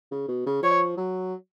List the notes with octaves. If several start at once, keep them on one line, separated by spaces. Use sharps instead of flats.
C#3
B2
C#3
F3 C#5
F#3